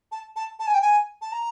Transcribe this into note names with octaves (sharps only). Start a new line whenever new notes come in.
A5
A5
A5
G#5
G5
G#5
A5
A#5